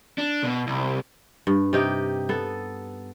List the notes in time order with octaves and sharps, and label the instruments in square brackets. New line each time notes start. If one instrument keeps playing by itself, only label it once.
[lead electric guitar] D4
B2
C2
[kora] G2
C3 D#4 G4
B3 A4